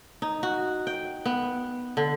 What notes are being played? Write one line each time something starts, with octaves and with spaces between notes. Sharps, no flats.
D#4
F#4
G5
B3
D3